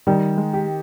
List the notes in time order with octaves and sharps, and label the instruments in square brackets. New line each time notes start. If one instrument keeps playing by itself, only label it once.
[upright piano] D#3 [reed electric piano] G3
[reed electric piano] G#3
[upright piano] G4